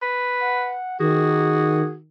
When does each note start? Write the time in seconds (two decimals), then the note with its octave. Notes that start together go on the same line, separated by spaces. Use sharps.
0.02 B4
0.41 F#5
1.00 D#3 F#4 G#4